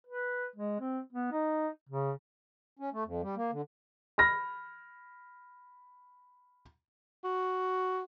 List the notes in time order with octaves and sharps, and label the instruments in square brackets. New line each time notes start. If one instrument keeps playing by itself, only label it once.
[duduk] B4
G#3
C4
B3
D#4
C#3
[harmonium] C#4
A3
F2
G3
A#3
D3
[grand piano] B5 F6 A#6
[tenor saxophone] F#4